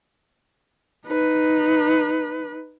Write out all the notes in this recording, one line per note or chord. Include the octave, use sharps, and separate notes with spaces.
D#4 B4